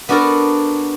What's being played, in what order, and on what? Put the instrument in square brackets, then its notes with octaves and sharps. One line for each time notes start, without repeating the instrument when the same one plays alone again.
[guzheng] B3 D4 F#4 A4 A#4 A5